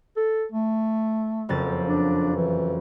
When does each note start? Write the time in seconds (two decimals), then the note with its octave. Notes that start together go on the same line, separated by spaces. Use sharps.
0.17 A4
0.52 A3
1.49 F#1 F2 A6
1.88 D4
2.36 E3